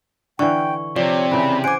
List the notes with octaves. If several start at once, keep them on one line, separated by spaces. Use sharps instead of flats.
D3 E3 G5 C#6
C3 F3 C#5 D5
C#3 E3 B5
C5 F#5 G#5 D6 D7